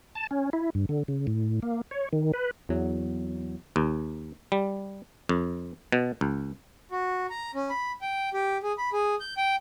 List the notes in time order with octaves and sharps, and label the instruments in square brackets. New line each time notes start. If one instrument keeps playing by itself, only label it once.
[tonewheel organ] A5
C#4
E4
G2
D3
C#3
A2
A#3
C#5
D#3
B4
[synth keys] E2 F#3
[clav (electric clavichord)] D#2
G3
F2
B2
C#2
[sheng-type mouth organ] F#4
A#5
C#4
B5
G5
G4
G#4
B5
G#4
G6
G5